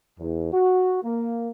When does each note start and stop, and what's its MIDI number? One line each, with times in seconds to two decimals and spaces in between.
0.19 0.50 40
0.52 1.02 66
1.03 1.50 58